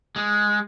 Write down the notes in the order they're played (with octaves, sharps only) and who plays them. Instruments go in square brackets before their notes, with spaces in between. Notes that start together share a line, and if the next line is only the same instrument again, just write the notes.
[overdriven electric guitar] G#3